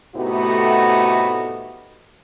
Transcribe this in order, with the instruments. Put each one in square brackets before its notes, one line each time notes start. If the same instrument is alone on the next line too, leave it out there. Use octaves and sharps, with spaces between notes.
[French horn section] A2 C3 A3 B3 D#4 F#4